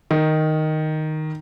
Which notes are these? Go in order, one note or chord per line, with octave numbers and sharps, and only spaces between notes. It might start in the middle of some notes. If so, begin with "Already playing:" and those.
D#3